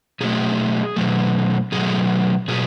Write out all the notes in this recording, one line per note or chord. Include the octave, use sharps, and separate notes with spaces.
B2 F#3 A3 G#4
B2 F#3 A3
B2 F#3 A3 G#4
B2 F#3 G#4